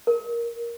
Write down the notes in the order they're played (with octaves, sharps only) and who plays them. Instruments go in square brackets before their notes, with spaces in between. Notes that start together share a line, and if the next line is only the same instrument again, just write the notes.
[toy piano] A#4